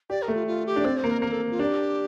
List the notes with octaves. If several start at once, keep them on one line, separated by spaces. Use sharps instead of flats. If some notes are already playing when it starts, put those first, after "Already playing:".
G4 D5
A#4
A3
F4
F4
G4
D4
C4 D5
C5
A#3
A#4
A#3 A#4
A4
F4
D4 G4